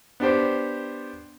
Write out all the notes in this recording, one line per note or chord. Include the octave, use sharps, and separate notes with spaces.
B3 D4 G4 C5